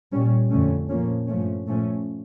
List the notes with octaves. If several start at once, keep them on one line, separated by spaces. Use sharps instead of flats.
A#2 G3 C#4
F2 D3 A3 C#4
A#2 F3 A#3 C#4
G2 F3 A3 C#4
A#2 F3 A3 C#4